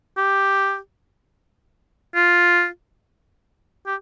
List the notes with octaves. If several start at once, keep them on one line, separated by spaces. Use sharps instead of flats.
G4
F4
G4